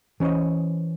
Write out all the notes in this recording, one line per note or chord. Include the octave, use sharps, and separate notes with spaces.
E3 C#4 C5 C#5 D#5